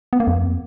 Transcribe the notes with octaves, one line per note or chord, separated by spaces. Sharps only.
B3
A#3
F2